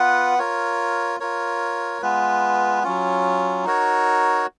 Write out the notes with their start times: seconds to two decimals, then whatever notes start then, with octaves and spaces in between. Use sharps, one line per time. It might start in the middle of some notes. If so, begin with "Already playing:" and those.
Already playing: B3 F4 B4 F#5
0.39 F4 A#4 C#5
1.20 F4 A#4 C#5
2.02 G#3 B3 F4 B4
2.83 F#3 C#4 F4
3.65 D#4 F#4 A#4 C#5